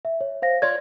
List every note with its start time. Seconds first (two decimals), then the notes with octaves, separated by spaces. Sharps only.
0.05 E5
0.21 C#5
0.42 C5 F5 A#6
0.62 F4 C#5 D5 G#6